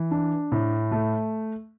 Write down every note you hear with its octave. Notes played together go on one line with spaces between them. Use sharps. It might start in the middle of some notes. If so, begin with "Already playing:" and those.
Already playing: E3
D4
A2
A3